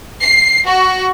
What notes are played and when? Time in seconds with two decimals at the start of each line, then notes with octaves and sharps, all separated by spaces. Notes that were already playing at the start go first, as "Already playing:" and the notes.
0.22 C7
0.66 F#4